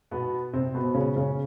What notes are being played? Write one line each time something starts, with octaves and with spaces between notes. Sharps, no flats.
B2 B3
C3 C4
B2 B3
C#3 C#4
C#3 C#4